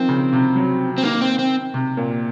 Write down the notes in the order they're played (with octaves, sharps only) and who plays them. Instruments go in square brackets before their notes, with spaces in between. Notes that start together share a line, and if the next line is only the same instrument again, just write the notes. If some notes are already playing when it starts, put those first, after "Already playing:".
Already playing: [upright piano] D#3 F3 [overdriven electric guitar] C4
[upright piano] C#3
C3
F#3
[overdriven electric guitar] C4
[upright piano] D#3 [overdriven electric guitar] A#3
[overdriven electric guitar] C4
C4
[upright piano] C3
A#2